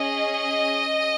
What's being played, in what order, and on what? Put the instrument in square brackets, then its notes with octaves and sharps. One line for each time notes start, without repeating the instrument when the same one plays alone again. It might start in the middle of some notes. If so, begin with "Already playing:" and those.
Already playing: [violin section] C#4 G#4 D#5